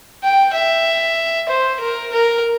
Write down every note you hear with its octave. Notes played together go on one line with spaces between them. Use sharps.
G5
E5
C5
A#4
A#4